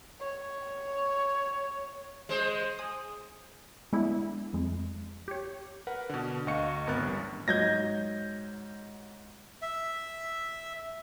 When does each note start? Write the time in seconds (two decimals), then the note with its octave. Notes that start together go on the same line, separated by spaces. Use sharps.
0.20 C#5
2.29 G#3 C5
2.79 G#5 D#6
3.93 G#3 B3 D4 E4
4.53 F2 G#3
5.28 G4 C#5
5.87 A#4 B4 F#5
6.09 B2 D3
6.47 D2 D#5 F5 C#6 C#7
6.87 G#1 B3 A#4 F#6 A6
7.00 A1 G2
7.48 G#2 F#3 D#5 G6 G#6 A#6
9.62 E5